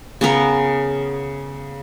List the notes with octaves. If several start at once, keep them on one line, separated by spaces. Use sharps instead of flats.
C#3 B3 A#4